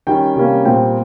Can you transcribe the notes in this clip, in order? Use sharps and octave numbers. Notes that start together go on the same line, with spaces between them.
D#3 G3 C#4 G5
C3 G3 A#3 C#4
A#2 G3 C4 G5